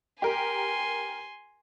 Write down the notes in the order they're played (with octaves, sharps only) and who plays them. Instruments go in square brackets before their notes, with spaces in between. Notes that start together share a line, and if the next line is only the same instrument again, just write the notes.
[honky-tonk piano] G4 A#4 [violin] G#5 C6